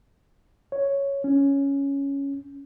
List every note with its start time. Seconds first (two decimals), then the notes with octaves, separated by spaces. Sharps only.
0.72 C#5
1.24 C#4